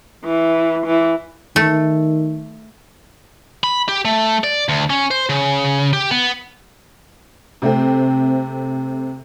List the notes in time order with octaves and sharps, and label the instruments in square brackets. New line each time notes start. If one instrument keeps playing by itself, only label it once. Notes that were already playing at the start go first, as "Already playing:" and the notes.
[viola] E3
E3
[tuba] D#3 [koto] A3
[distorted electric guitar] B5
G4
A3
D5
D2
C#4
C5
C#3
G4
B3
[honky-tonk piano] C3 A3 C4